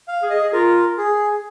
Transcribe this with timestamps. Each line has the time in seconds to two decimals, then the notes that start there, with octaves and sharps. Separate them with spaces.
0.08 F5
0.23 G#4
0.30 D#5
0.41 G#4
0.53 F4 A#4
0.98 G#4